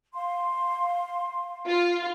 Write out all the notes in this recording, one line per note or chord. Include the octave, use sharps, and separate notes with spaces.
F5 C6
F4